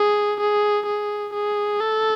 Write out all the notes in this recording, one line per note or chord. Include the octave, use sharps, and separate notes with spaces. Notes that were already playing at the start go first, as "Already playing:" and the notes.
Already playing: G#4
G#4
G#4
G#4
A4